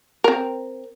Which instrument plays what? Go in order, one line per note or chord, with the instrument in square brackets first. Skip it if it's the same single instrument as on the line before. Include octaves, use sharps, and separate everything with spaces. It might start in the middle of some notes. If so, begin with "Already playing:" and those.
[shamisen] C4 A#4